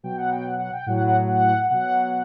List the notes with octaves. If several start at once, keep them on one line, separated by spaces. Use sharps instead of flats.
B2 F#3 G5
F#5
G5
F#5
F#5
G5
A2 F#3 F#5
F#5
F#5
F#5
B2 F#3 F#5